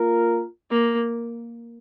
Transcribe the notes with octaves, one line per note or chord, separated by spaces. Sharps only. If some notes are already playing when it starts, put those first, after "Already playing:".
Already playing: A#3 F4 A#4
A#3